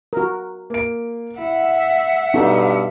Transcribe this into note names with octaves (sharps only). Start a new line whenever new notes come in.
F#4 A#4
A#3 D7
E4 E5 F#5
G2 B2 D#4 A4